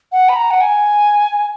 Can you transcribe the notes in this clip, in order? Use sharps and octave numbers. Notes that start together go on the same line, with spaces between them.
F#5
B5
A#5
F#5
G#5